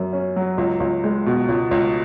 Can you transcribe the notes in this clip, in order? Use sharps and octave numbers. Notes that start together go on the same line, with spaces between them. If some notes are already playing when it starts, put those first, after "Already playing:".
Already playing: F#2 F#3
C#4
F#3
C#2
C#2
G#3
B2
C#2
C#2